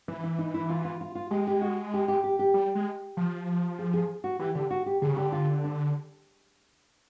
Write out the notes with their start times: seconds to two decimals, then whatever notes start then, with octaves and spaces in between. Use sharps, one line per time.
0.08 E3 E4
0.24 E4
0.38 D#4
0.54 E4
0.69 F4
0.85 F4
1.01 F4
1.15 F4
1.31 G#3 G4
1.47 G4
1.62 F#4
1.94 G4
2.08 G4
2.24 G4
2.39 G4
2.54 G3
2.75 G#3
3.17 F3
3.79 G#4
3.94 G#4
4.24 F#4
4.39 E3 G4
4.55 D3 G4
4.71 F#4
4.86 G4
5.02 D3 G#4
5.09 C#3
5.17 D3 G4
5.32 F4
5.64 D4